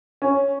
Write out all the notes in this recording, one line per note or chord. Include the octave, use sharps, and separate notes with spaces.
C#4